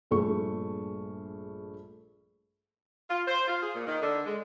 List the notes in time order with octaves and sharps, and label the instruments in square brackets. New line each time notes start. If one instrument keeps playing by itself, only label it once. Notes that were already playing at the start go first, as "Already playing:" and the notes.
[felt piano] A#1 G2 A3 G#4 C#6
[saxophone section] F4
C5
F4
G#4
A#2
D#3
D3
G#3